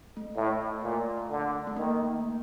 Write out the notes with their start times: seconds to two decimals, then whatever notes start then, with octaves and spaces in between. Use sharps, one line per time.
0.17 A3
0.36 A2
0.83 A#2
1.30 D3
1.67 A3
1.77 D#3 A#3